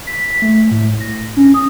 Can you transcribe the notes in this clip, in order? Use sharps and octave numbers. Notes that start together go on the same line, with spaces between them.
B6
A3
A2
A#6
C#4
D#6